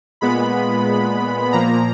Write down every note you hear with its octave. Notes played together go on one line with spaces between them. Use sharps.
A#2 G#3 B3 B5
A#2 F3 A#3 A#5